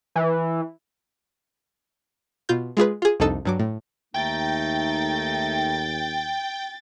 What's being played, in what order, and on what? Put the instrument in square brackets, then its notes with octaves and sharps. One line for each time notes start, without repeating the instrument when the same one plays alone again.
[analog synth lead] E3
[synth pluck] B2 F4 G6
G#3 F4 G#4 B4
F4 G#4
C2 F2 D4 D#4 A4 E6
G2 F#3 D6
A2
[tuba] D#2 [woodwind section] A3 D#4 [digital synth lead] G5 [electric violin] A6